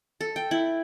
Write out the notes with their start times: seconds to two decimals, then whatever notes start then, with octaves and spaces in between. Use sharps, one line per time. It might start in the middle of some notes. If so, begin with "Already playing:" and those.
0.21 A4
0.36 G5
0.51 E4